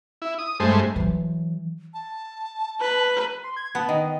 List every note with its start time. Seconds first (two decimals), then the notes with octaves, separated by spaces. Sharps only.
0.22 E4
0.39 D#6
0.60 G2 G#3 A3 C5
0.96 E3 F#3
1.94 A5
2.81 B4
3.44 C6
3.57 G#6
3.75 B3 F#5 A5
3.89 D#3 D#5